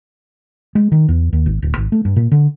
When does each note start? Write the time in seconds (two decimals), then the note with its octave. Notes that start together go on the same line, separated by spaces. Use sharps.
0.75 G#3
0.92 D#3
1.09 E2
1.33 D#2
1.46 G#1
1.62 D1
1.77 G#1
1.92 A3
2.05 G2
2.16 A#2
2.32 D3